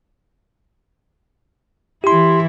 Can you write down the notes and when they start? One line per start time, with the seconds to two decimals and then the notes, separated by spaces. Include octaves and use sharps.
2.04 E3 E4 G4 C6